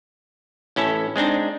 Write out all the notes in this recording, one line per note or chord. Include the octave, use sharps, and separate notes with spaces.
A1 C#4 E4 A4
G#3 C4 D4 D#4